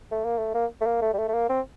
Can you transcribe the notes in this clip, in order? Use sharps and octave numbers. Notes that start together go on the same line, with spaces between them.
A3
A#3
A3
A#3
A3
A#3
A3
G3
A3
A3
A#3
C4